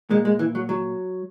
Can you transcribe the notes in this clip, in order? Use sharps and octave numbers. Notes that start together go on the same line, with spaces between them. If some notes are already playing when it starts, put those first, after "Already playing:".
A#2 G#3
G#3
E3
F#3
F#3